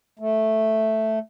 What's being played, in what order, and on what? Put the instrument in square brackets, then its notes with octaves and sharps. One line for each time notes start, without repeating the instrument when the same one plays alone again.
[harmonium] A3